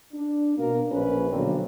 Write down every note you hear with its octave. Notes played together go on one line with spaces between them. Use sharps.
D4
B2 A#3 A#4
A#1 C#4 B4
B1 D3 A#3 C4 D4